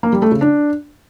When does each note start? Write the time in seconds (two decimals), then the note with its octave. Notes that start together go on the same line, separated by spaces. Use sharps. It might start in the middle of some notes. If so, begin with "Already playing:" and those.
0.03 A#3
0.13 G3
0.22 A3
0.32 C#3
0.41 D4